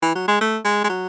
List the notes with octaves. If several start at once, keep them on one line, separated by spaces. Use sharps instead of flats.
E3
F#3
G#3
A3
G#3
G#3
F#3